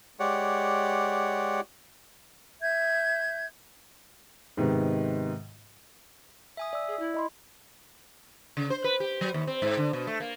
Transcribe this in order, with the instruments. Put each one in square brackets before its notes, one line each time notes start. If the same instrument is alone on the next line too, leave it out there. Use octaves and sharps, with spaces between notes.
[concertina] G#3 G4 C#5 D5 F#5
[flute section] E5 G6 G#6
[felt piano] G#2 C3 D#3 B3
[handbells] E5 G#5 D#6
[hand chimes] D5 E6 [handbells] E5
[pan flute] G#4
E4
[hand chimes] D#5 B5 C6
[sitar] C#3
C5
B4
G4
F#3
D#2
C4
G#2
D3
B2
A3
A#3